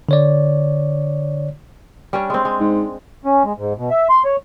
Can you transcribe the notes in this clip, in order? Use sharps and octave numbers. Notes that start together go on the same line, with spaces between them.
D3 C#5 D5
G3 C#4 D4
G#3 C4
G#3
G#2
C#4
G#3
G#2
B2
E5
C6
C#5